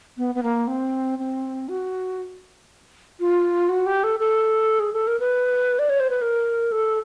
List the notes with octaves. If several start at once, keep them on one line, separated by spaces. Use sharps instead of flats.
B3
B3
A#3
C4
C4
F#4
F4
F#4
G4
A4
A4
G#4
A4
A#4
B4
D5
C#5
C5
B4
A#4
A4